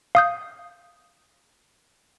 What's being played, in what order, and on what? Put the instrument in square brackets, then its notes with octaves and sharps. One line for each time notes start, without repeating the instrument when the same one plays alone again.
[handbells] F5 D#6 G6